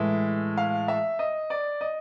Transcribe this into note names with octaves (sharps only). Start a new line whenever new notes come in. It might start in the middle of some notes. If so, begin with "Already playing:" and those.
Already playing: A2 E3 G#3 E5
F5
E5
D#5
D5
D#5